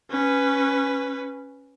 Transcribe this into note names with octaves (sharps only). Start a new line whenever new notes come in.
C#4 B4